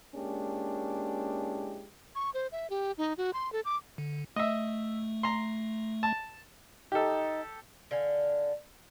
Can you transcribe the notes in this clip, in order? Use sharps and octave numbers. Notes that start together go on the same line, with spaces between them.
G#3 A#3 C#4 D4 E4 G4
C#6
C5
E5
G4
D#4
F#4
C6
A4
D6
D3
A3 D#5 E5
A#5 C6
A5
D#4 G4 A4
D3 F5 G#5